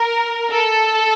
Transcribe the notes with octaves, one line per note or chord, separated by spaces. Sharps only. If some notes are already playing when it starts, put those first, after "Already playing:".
Already playing: A#4
A4